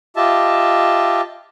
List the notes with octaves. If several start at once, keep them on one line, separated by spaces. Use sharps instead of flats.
F4 G4 D#5 E5 A5